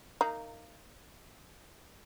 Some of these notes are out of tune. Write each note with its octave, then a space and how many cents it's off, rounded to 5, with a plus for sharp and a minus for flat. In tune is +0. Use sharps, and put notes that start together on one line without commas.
A#3 -20 D#4 -5